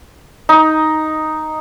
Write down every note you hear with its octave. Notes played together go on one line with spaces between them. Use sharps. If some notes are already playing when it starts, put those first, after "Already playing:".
D#4